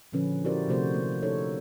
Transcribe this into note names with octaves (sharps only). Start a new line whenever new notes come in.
A#2 D3 F3 C#4 B4
E4 F#4 G4 A#4 C5 D5
C3 F3 A3 F#4 C5
A#3
D#4 A4 C#5